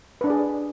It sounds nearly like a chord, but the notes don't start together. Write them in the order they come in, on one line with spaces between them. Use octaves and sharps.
B4 D4 D5 G#4